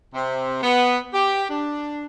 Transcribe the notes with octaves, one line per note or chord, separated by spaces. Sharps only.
C3
B3
G4
D4